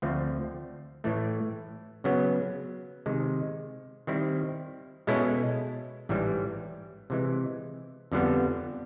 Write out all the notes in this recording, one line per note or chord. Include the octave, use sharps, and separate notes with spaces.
D2 D3 F3 A3 C4
A2 E3 A3
C#3 F#3 B3
C3 D#3 G#3
D#3 G3 C4 E4
B2 G#3 C#4 E4 A4
A1 G#2 E3 G3
C3 E3 G#3
F2 D3 G3 B3